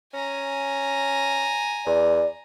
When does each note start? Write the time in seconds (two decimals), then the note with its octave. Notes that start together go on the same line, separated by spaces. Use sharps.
0.13 C#4 G#5 A#5
1.86 E2 D5